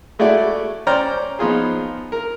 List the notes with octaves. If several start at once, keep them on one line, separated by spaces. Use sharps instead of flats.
G#3 A3 E4 F#4 D5 F#5
C#4 C5 D5 G5 A#5 F6
F3 B3 D#4 F4 G#4
A#4